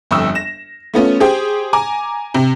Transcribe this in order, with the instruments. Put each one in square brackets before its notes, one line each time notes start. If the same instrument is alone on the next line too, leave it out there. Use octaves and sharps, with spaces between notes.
[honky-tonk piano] G1 F2 C#6 D#6 E6
A#6 E7
A3 B3 C#4 F4
G4 G#4 C5 G5
G#5 A#5 D6
C3